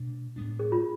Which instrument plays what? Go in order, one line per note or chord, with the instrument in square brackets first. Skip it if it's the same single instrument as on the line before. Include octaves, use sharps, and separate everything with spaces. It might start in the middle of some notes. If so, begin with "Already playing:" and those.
Already playing: [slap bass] B2 A3 D4
A2 G#3 B3 D4
[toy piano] G#4
F4